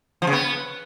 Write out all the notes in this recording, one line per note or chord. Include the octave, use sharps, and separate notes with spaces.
F3
C#3
B3